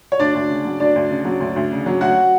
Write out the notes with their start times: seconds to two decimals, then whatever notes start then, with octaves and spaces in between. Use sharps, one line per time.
0.12 C#5
0.19 D2 D4 D5
0.35 D2
0.50 C#3
0.65 F#3
0.80 D2 D4 D5
0.96 D2
1.11 C#3
1.25 F#3
1.40 D2
1.56 D2
1.72 C#3
1.86 F#3
2.01 D2 F#4 F#5